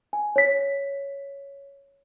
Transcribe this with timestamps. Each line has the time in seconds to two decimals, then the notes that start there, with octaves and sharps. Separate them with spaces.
0.13 G#5
0.36 C#5 B6